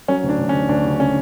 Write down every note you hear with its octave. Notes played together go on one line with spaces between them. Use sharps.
F#3 C#4
D2
D4
D2
C#4
D2
D2 D4
C#3
C#3 C#4